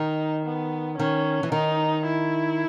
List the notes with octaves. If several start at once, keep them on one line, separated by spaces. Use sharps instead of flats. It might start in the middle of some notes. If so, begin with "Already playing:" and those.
Already playing: D#3 D#4
B3
D#3 C#4
E3
D#3 D#4
E4